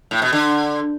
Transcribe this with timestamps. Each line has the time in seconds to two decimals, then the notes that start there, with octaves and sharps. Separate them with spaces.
0.11 A2
0.22 B2
0.33 D3